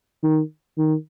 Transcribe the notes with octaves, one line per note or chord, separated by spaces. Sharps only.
D#3
D#3